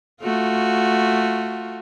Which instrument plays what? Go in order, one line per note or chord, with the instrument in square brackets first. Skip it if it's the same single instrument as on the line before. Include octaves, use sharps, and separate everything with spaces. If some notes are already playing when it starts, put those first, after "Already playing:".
[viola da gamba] A3 F4 F#4